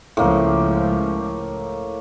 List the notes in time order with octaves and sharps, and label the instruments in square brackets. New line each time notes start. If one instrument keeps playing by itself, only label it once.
[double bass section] C#2 F3 [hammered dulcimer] A2 A#3